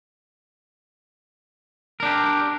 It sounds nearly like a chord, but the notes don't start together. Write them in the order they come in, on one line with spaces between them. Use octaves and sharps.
A#4 D4 G4